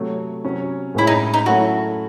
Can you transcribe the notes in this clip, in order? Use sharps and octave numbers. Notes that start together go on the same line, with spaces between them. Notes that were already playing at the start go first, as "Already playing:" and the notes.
Already playing: C3 F#3 A3
C3 F#3 C#4
A2 G#3 C#4 E4 G#4 C#5
D#4
D#4
F#3 A3 C#4 E4 F#4 A4